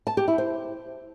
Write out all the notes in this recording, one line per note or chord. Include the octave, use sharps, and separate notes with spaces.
A5
G4
E4
C5